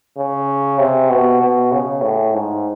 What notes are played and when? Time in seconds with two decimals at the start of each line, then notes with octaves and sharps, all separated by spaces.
0.18 C#3
0.79 C3
1.10 B2
1.41 B2
1.72 C#3
2.02 A2
2.34 G#2